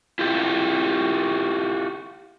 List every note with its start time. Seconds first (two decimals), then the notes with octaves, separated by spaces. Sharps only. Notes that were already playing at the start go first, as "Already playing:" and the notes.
0.19 E4 F4 G4